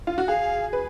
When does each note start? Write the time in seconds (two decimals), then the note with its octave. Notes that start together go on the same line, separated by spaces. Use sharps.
0.07 F4
0.18 F#4
0.28 G#4 F5
0.73 B4